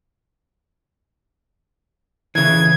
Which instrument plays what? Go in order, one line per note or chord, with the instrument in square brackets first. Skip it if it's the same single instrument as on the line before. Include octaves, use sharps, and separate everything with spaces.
[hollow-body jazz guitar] C#3 E3 [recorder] G#6